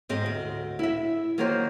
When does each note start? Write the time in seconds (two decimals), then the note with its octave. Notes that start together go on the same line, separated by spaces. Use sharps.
0.09 G#2 C4 G4 D#5
0.26 D2
0.79 E4 E5
1.38 D#3 F#3 A#3 F4 A#4 C5